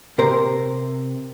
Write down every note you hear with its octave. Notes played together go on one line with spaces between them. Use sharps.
C3 A#4 C5